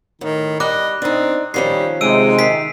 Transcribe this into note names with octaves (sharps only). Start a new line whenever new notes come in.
A2 D#3
G3 D#5 D6 F#6
C4 D4 D#4
D#3 F3 G3 C#4 C7
C3 G#3 D#4 E6 D7 D#7
D#3 B6 C7